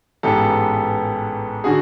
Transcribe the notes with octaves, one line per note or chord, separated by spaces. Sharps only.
A1 G#2 E3 G#3 B3 G4 A4
D3 F#4 G#4